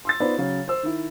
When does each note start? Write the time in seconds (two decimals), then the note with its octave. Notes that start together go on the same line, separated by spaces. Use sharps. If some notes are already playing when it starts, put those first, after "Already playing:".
0.05 C6 E6 A6
0.20 B3 D#4 F4 B4 C5 D5
0.38 C#3 F#3
0.68 C5 E6
0.83 D#3 E4